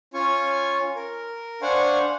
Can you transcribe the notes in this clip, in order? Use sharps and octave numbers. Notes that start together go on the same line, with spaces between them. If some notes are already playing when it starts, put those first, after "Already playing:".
C#4 F4 G#5 C#6
A#4
D4 C5 F5 F#5 G#5 C#6